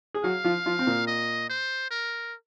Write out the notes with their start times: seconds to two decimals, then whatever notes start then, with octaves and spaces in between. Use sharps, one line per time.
0.14 G#4
0.24 F#3 F#4 F5
0.44 F3 F4
0.66 F3 F4
0.79 C4
0.87 A#2 A#3
1.07 D#5
1.49 C5
1.91 A#4